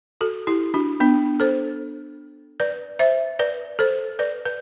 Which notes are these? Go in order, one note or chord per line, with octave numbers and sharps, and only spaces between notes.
F#4 A4
E4 G4
D4 F#4
B3 D4
A4 C5
B4 D5
C5 E5
B4 D5
A4 C5
B4 D5
B4